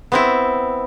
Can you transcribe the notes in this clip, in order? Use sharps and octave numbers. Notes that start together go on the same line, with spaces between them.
B3 C4 E4